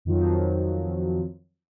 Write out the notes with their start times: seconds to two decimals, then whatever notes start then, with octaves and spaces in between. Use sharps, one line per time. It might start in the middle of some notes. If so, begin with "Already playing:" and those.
0.05 F2 D#3 F3 F#3